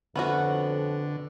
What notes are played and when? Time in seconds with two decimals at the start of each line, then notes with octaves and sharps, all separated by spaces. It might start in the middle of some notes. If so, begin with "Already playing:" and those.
0.16 F2 D3 B3 C#4 F#4